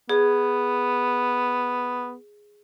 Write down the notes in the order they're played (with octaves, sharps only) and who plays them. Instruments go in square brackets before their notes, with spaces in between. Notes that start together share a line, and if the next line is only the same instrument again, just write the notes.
[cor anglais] B3 [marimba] G#4